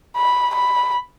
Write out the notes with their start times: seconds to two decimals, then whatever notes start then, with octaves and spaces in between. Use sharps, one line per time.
0.17 B5
0.55 B5